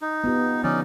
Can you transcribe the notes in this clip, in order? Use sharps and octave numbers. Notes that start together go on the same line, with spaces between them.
D#4
B3 F4 G4
D3 F3 C#4 D#4 D5